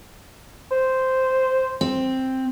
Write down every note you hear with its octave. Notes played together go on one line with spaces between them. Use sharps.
C5
C4